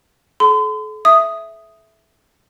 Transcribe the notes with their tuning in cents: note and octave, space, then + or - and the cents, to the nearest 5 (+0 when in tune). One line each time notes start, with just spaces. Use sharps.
A4 -45 C6 -45
E5 +0 D#6 +0